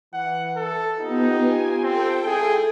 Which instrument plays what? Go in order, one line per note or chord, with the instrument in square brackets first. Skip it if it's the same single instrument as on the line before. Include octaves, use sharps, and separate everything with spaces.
[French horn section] E3 [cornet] F#5
[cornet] A4
[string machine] B3 [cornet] D#4 [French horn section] F4 G4
[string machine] G#5
[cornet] C4 [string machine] A4 G5
[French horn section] G#2 E4 [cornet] G#4